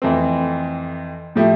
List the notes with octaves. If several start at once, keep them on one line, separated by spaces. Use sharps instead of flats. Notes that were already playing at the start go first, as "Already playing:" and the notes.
F2 E3 A3 C4
A2 F3 A3 E4 G4